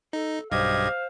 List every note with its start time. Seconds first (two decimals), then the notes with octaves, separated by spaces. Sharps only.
0.13 D#4 A4
0.52 B1 G2 G4 C5 D#5 F5 G#6